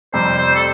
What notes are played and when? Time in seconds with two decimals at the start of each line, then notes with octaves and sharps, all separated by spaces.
0.13 F2 C3 G3 C5
0.38 C5
0.55 A4